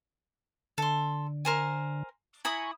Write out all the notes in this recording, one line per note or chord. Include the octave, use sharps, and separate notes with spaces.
D3 A4 C6
A#4 C5 G#5
E4 G#5 A#5 B5 C#6 D#6